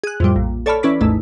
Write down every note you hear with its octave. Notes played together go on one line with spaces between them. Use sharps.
G#4 F#6
F2 A2 G3
A#1
A4 C#5 D5 A5 B5 F6
E3 C#4 E4 B4 D5 B6
G#1 D#2 G#2 A3 E4